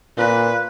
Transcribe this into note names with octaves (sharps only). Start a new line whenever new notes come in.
A#2 B4